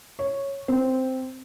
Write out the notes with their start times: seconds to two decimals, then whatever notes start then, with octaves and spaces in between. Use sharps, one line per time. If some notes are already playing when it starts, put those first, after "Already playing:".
0.19 C#5
0.68 C4